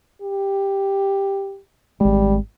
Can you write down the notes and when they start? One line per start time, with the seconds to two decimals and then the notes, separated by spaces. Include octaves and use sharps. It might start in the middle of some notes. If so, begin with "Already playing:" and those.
0.22 G4
2.01 G#1 G3 G#3